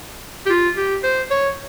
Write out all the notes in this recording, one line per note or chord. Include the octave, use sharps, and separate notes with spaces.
G4
F4
G4
C5
C#5